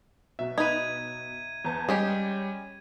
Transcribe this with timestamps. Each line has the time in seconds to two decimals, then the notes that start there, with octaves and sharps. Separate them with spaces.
0.39 B2 F#3 E5
0.58 D#4 B4 G#6 D#7
1.65 E2 B3 A5
1.89 G3 G#3 C#4 G4 G#4 G5